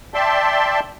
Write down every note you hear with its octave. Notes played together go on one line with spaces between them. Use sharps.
D5 E5 G5 A5 C6